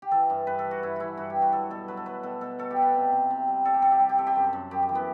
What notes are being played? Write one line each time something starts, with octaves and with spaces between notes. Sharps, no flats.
G4
E3 A4
G2
G2 B4
A4
E3
F#4
G2 E4
E3 E4 F#4
G2 F#4
G4
G2
F#4
F#3 A4
B2 A4
F#3 B4
A4
F#3 B4
B2 A4
B2 A4
F#3 A4
G4
B2
B4
C3
C3
C3
G3
G3 A4
G4
C3 A4
G4
G3
G4
C3 A4
G4
F#2
F#2
F#2 G4
G4
E3
B3